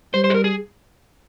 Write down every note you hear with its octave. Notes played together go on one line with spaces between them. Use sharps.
G3 C5
C5
G#4
A#4
G#4